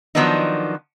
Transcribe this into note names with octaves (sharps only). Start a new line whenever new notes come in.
D#3 F3 F#3 B3 D4 D#4